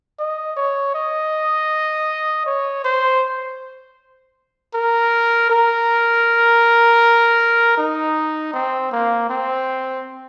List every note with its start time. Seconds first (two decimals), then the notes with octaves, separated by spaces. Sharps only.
0.19 D#5
0.57 C#5
0.94 D#5
2.46 C#5
2.84 C5
4.74 A#4
5.50 A#4
7.78 D#4
8.54 C4
8.92 A#3
9.29 C4